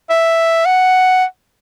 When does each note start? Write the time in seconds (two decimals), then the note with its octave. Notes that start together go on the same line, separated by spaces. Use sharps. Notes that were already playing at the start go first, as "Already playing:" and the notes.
0.10 E5
0.66 F#5